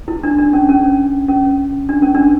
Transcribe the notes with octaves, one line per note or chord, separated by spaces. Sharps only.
E4
D4
D4
C#4
C#4
C#4
D4
C#4
D4